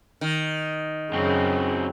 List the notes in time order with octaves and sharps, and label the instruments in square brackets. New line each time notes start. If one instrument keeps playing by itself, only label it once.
[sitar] D#3
[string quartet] F#2 C#3 [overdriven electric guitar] F#3 C4